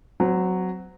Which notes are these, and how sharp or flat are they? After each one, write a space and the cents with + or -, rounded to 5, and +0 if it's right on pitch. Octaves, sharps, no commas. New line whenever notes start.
F#3 +0 C4 -30